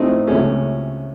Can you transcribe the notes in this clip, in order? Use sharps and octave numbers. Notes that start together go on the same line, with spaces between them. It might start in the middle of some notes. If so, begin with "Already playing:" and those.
Already playing: A2 F3 A3 C4 D#4
C#2 C3 F3 A3 C#4